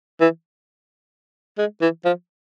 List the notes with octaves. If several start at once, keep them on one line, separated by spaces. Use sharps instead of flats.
E3
G#3
E3
F3